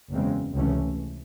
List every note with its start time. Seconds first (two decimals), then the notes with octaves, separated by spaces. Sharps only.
0.11 F#1 E2 C#3 G#3 C4
0.54 C#2 C3 E3 A3 C#4